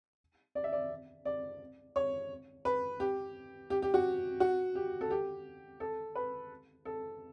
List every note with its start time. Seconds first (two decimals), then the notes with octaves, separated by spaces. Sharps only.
0.55 D5
0.64 E5
0.72 D5
1.25 D5
1.96 C#5
2.65 B4
3.00 G4
3.70 G4
3.82 G4
3.94 F#4
4.40 F#4
4.75 G4
5.01 A4
5.10 G4
5.80 A4
6.15 B4
6.85 A4